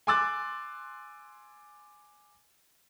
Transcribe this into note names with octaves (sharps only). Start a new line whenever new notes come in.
G#5 C6 D6 E6 F#6 A6